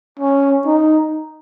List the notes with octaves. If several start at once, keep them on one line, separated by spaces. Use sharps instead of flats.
C#4
D#4